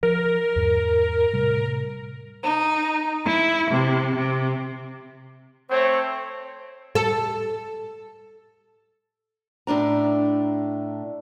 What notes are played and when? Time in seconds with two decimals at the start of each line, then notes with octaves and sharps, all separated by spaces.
0.03 F3 A#4
0.56 E2 G#2
1.33 A2 C3 G3
2.43 D#4
3.25 E4
3.72 C3
4.15 C3
5.70 A3 C4 C5 C#5
6.95 A4
9.67 A2 A3 D4 A#5